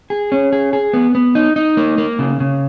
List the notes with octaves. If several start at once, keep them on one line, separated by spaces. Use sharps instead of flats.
G#4
C#4
G#4
G#4
B3
B3
D#4
D#4
A#3
A#3
C#3
C#3